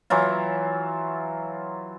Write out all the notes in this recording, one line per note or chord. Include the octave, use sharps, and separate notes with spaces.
E3 F#3 F4